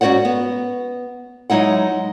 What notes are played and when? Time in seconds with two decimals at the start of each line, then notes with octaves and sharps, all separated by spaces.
0.01 G#2 C#4 F#4 C5 D5 F#5
0.25 B3
1.50 F#3 G#3 D#4 E4 F#5